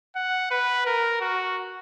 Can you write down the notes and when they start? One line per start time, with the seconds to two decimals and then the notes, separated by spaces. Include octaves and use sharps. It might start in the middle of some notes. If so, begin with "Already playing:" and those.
0.16 F#5
0.51 B4
0.86 A#4
1.21 F#4